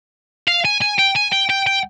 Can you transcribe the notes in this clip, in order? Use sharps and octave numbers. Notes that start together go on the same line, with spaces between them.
F5
G#5
G#5
G5
G#5
G5
G5
G5